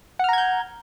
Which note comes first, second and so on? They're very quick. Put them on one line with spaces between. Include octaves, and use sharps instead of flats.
F#5 F6 A#5 G#6 G6